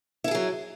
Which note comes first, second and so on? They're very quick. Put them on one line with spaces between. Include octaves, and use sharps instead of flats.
E4 A4 G#4 F#3